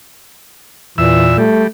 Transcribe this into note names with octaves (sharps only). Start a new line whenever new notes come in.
E2 A#2 E3 E5 E6
G3 A3